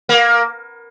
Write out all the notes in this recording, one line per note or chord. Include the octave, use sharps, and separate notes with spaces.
A#3